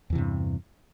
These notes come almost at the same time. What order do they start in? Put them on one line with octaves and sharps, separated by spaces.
E2 E3 C3 G2